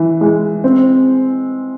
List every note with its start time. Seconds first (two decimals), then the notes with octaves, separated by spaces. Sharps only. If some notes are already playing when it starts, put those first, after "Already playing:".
Already playing: E3
0.21 G#3
0.64 C4